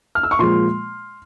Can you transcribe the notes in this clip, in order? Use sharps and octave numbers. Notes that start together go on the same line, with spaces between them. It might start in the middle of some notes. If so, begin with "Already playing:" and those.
F6
E6
C#6
A#2 F3 G#3 C6